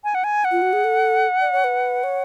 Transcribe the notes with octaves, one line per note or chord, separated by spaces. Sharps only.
G#5
F#5
G#5
F#5
F4
F#4
G#4
A4
D5
C#5
B4
C#5